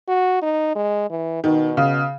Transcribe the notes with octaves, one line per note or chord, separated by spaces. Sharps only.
F#4
D#4
G#3
E3
B2 D#3
C#3